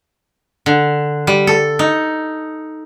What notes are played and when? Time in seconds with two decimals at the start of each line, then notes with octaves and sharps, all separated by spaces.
0.66 D3
1.27 G3
1.47 A4
1.79 D#4